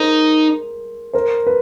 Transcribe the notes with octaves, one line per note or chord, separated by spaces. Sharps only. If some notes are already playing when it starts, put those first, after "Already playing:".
Already playing: D#4 G#4 A#4 C5
A#4 C5
B4